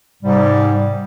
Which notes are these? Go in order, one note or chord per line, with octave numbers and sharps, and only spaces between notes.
G#2 C3 G3